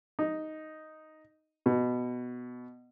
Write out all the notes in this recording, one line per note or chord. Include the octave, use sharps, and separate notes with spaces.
D#4
B2